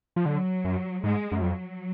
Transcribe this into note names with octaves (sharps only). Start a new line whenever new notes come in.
F3
D3 F#3
F#2
G#2 G#3
F#2
F2 F#3